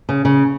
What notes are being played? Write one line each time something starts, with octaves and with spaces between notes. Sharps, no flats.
C#3
C#3